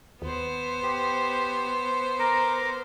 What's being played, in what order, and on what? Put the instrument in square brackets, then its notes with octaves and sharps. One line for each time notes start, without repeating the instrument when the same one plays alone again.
[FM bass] D#2 [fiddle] B3 C5
[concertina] G4
A#4 A#5 D6